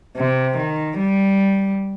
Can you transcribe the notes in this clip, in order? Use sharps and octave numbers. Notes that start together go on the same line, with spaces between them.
C3
D#3
G3